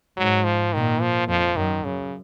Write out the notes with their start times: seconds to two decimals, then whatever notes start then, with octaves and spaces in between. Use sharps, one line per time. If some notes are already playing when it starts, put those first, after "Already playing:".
0.17 G#2 F#3
0.44 F3
0.73 A#2 D#3
1.01 F3
1.28 F2 F3
1.56 F#2 D#3
1.85 F#2 C#3